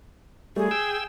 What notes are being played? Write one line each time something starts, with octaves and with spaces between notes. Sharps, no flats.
G3 A3 G#4
G5 E6